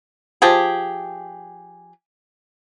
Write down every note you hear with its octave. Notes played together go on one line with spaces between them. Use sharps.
F3 G4 G#4